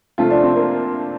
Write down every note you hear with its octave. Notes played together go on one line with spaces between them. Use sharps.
C3 F3 A3 F4
D4
C4
A#3